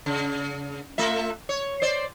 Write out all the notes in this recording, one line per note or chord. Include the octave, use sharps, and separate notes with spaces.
C#3
A3 F4 E5
C#5
C5 D5